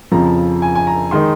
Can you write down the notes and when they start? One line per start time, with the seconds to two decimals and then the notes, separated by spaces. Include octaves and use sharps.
0.12 F2 C#3 F3 A#5
0.62 G#5
0.75 G#5
0.87 A#5
1.11 D#3 G#3 D#4 C6